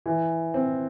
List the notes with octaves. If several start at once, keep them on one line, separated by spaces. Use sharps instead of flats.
E3
C4